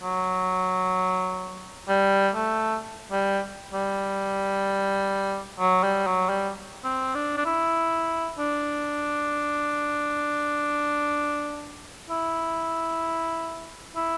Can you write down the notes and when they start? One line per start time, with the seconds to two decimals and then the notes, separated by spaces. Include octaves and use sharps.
0.03 F#3
1.88 G3
2.35 A3
3.12 G3
3.74 G3
5.60 F#3
5.83 G3
6.07 F#3
6.29 G3
6.84 C4
7.15 D4
7.37 D4
7.46 E4
8.39 D4
12.10 E4
13.96 E4